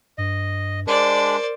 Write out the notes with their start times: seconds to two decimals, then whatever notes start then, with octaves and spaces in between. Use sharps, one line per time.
0.18 G2 D#5
0.87 G#3 D4 A#4 C5 D5